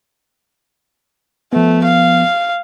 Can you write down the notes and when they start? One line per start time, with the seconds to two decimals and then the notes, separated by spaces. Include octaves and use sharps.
1.53 F3 A3 B3
1.84 F5